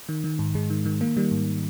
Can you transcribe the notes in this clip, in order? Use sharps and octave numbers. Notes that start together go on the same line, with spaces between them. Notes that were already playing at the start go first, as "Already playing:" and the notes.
D#3
D#3
G#2
G#2 G#3
D#3
D#3
D#3 A#3
D#3 G3
G#2